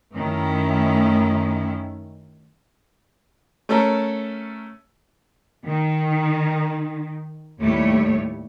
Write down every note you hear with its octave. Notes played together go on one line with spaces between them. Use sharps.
F#2 D#3 A3 C#4 E4
A3 C#4 A4 A#4
D#3
D#2 A2 G3 A3 C#5